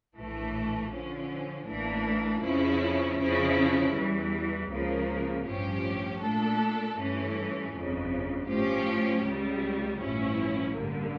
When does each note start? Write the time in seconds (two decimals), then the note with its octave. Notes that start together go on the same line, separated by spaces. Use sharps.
0.17 A#1 A2 E3 A3
0.92 D3 F3 C#4
1.68 A1 A2 E3 A#3 D4
2.44 F2 C#3 F3 C#4 E4
3.19 F2 C#3 F3 C#4 E4
3.95 E2 E3 G3
4.71 C#2 C#3 F3 A#3
5.47 A1 G2 F3 C#4 G4
6.23 A#2 A3 D4 A4
6.98 G2 E3 A3 C#4
7.74 G1 F2 C#3
8.50 A2 F3 C#4 G4
9.25 C#2 C#3 G3
10.02 A1 G2 F3 C#4 E4
10.77 A1 G2 D3 G3 A#3